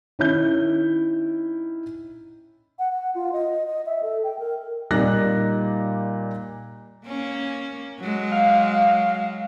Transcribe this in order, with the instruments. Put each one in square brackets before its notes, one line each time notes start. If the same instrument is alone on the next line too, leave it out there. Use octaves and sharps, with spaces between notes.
[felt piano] D#3 C#4 E4 G6
[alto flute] F#5
F#5
F4
D#5
D#5
E5
A4
G5
A#4
[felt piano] A#2 G3 A#3 D#4 F#6 A#6
[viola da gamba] A#3 C#4
F#3 G#3
[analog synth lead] F5